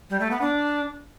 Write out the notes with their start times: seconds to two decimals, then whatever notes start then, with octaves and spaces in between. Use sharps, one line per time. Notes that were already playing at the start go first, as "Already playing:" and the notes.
0.10 G3
0.20 A3
0.31 B3
0.41 D4